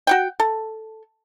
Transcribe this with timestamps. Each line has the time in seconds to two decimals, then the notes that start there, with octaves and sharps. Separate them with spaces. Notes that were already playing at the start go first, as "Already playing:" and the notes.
0.07 F#4 F#5 G5
0.40 A4